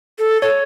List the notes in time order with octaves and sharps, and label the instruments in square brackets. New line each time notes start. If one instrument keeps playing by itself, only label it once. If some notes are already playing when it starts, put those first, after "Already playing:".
[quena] A4
[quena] A4 [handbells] C#5